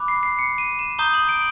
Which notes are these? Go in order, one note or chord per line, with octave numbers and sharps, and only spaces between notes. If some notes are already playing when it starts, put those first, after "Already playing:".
Already playing: B5 D6 F#6
C7
C7
C#7
D#7
E7
A#5 D#6 G6 G7
F#7
D7